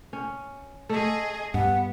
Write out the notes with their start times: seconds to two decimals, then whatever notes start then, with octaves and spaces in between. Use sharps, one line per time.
0.13 C#4
0.89 A3 G#4 D#5
1.54 G2 B3 F#5